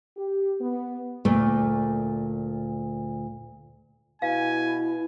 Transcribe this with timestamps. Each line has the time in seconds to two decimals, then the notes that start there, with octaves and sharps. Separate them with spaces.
0.16 G4
0.60 B3
1.25 D2 A#2 A3 A#3
4.22 B2 E4 F5 G#5